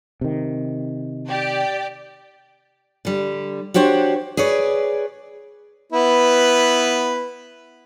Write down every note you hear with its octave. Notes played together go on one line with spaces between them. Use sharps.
C3 D#3
G4 D5
D3 G3
D4 F#4 G4 C5 C#5
G#4 B4 C#5 D5
B3 E4 B4